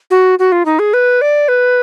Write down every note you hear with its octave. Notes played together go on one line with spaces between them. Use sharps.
F#4
F#4
F4
D#4
G#4
B4
D5
B4